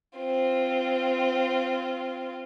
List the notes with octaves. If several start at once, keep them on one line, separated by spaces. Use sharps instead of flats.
C4 F4